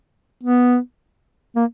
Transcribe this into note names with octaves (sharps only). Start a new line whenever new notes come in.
B3
A#3